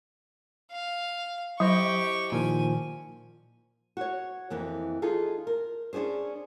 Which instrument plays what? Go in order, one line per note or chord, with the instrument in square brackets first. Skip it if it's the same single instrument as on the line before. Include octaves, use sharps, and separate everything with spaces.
[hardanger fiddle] F5
[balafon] F#3 [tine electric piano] E4 C5 D#5 [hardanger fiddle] G4 C#6
[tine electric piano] A#2 D#3 F3 [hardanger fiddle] G#5
[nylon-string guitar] F#4 C#5
F2 E3 A#3
D#4 F4 G#4 A4
A#4
C#4 D4 F4 G#4 C5